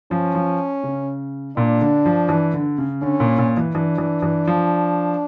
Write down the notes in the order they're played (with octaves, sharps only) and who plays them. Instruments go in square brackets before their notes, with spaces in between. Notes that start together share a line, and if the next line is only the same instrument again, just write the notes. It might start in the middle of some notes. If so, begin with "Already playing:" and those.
[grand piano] F3 [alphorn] C#4
[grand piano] F3
C#3
[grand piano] A#2 [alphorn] D4
[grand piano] D3
F3
E3
D3
C#3
[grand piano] D3 [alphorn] C#4
[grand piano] A#2
A#2
E3
[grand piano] E3 [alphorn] D4
[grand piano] E3
E3
F3